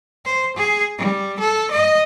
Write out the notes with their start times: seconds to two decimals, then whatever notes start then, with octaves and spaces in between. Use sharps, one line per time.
0.25 C5
0.56 G#4
0.98 G3
1.39 A4
1.71 D#5